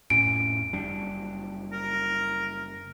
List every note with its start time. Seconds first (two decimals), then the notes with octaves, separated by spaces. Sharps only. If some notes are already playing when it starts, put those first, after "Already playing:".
0.10 F2 A2 C#4 D7
0.73 F#1 G3 D4
1.73 A#4